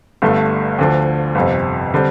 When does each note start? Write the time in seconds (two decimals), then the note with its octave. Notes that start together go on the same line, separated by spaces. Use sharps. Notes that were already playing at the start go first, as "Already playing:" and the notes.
0.22 G1 G2 D3 A3
0.78 D2 D3 F3
1.35 G1 F2 C3
1.94 D3 G3 C4